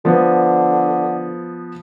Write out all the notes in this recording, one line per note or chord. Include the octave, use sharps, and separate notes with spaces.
D3 F3 B3